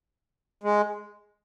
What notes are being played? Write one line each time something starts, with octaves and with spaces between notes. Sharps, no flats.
G#3